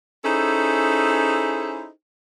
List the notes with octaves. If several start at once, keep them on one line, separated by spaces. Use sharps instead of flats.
C#4 D#4 E4 G#4 A4 C5